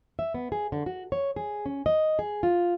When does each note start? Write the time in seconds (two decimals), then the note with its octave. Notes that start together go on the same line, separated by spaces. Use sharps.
0.19 E5
0.34 B3
0.52 G#4
0.72 D3
0.86 F#4
1.12 C#5
1.36 G#4
1.66 C#4
1.86 D#5
2.19 G#4
2.43 F4